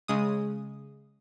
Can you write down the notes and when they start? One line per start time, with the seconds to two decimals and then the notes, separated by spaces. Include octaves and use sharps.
0.08 C#3 G#3 D#6